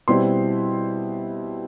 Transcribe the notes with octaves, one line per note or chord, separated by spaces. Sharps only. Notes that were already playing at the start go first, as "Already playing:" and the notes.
B2 G3 C4 E4 C6